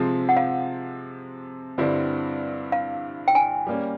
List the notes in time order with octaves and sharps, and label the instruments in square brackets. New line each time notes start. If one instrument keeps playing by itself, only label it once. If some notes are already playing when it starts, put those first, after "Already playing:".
Already playing: [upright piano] C3 F3 G#3 C4
[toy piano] F#5
F5
[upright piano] G2 D3 G3 C4 E4
[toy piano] F5
G5
G#5
[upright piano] G3 A#3 C#4